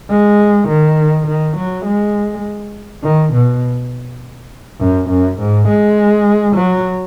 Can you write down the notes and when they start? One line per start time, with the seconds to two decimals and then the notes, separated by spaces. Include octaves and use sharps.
0.10 G#3
0.69 D#3
1.27 D#3
1.57 F#3
1.86 G#3
3.03 D#3
3.33 B2
4.80 F#2
5.10 F#2
5.39 G#2
5.68 G#3
6.56 F#3